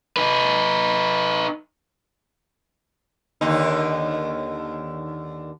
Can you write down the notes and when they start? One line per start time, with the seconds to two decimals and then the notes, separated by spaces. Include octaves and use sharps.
0.17 D#4 B4
3.41 D#2 D3 D#4